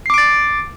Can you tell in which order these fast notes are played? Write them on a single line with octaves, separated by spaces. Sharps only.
C7 D6 D7 A6